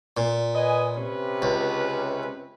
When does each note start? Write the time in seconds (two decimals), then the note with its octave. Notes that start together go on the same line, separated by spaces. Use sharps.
0.17 A#2
0.53 B4 D#5 G#5
0.96 C3 C#4 B4
1.42 C#2